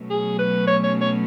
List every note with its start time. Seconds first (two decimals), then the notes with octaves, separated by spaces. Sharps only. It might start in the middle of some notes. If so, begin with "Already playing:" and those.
Already playing: B2 F#3 A3 C#4
0.10 G#4
0.39 B4
0.67 C#5
0.84 C#5
1.01 C#5